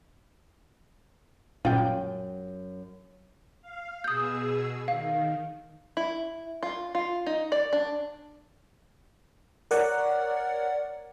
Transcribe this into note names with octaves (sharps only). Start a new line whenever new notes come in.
G1 F#2 A#2 C#4 F4 G5
F5
B2 G#4 D#6 E6 G6
D#3 F5
E4
F4
F4
D#4
D5
D4
A#4 C#5 D5 F#5